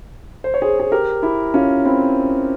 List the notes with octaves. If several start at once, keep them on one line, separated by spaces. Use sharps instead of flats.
C5
C#5
G#4 C5
G#4
G4 A#4
E4 G4
C#4 F4
C4 E4